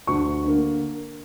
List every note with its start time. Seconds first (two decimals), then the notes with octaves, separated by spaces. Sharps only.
0.07 D2 C#6
0.44 D3 A#3